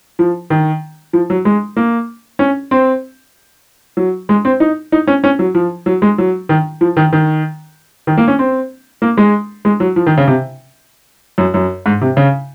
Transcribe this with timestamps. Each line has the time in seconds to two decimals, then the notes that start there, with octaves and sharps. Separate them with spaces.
0.19 F3
0.50 D#3
1.13 F3
1.30 F#3
1.45 G#3
1.77 A#3
2.39 C#4
2.71 C4
3.97 F#3
4.29 G#3
4.45 C4
4.60 D#4
4.92 D#4
5.07 C#4
5.24 C#4
5.39 F#3
5.55 F3
5.86 F#3
6.02 G#3
6.18 F#3
6.49 D#3
6.81 F3
6.97 D#3
7.13 D#3
8.07 D#3
8.17 A#3
8.28 C#4
8.39 C4
9.02 A#3
9.17 G#3
9.65 G#3
9.80 F#3
9.96 F3
10.06 D#3
10.17 C#3
10.27 C3
11.38 F#2
11.54 F#2
11.86 G#2
12.01 C3
12.17 C#3